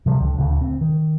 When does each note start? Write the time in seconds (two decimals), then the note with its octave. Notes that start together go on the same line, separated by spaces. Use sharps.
0.06 C3 F3 G3
0.20 C#2 D3
0.38 D#1 D2 C#3
0.61 C4
0.81 D#3